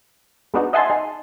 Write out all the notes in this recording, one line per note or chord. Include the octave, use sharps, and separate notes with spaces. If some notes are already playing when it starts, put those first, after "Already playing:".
G#3 B3 D4 D#4 F#4
D#5 E5 F#5 G#5 A5 C6
D#4 G#4